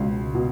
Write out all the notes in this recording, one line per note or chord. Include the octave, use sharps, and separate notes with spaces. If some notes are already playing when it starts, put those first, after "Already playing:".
Already playing: C#2 B2
B2